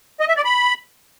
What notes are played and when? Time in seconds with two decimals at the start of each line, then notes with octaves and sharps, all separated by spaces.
0.20 D#5
0.28 E5
0.36 D5
0.45 B5